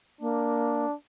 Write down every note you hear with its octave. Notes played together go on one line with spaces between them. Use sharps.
A#3 D4